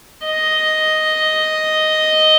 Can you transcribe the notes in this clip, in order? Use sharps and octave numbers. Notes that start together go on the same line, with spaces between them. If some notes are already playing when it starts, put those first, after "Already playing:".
D#5